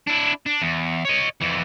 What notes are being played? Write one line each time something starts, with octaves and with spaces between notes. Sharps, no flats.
D4 E4
D4
E2
C#5 D#5
F2 E3